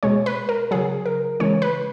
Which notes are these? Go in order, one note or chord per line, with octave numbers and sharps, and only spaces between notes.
B2 G#3 C#5
B4
A#4
C#3 F#3 G#4
A#4
C#3 E3 G#3 C#5
B4